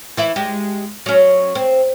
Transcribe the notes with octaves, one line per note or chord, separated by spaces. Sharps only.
E3 E4
G#3 G4
F#3 C#4
C4